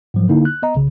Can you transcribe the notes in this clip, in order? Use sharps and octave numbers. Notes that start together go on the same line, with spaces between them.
G#2 F3 F#3
D3 A#3 D#4 E4
F#6
B3 D#5 A#5
B1 C#3